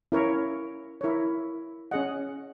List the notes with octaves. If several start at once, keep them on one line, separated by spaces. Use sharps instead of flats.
C#4 E4 A#4 C#5
E4 A#4 C#5
C#4 G#4 D#5 F#5